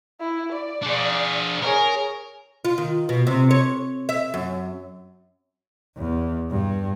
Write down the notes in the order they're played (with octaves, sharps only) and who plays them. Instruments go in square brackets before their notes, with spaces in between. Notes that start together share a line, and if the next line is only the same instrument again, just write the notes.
[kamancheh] E4
D5
[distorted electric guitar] D4 G#4
[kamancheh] G#4 C#5 [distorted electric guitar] A#4
[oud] F4
D#3
B2
C3
C#5
E5
F#2
[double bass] E2
G2